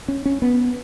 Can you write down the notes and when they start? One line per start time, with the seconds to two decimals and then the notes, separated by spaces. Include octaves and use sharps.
0.08 C#4
0.26 C#4
0.42 B3